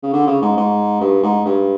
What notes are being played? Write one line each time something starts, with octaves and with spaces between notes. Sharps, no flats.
C#3
D3
C#3
G#2
G#2
G2
G#2
G2